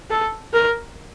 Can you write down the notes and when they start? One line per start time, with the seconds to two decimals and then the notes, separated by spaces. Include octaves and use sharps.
0.10 A4
0.54 A#4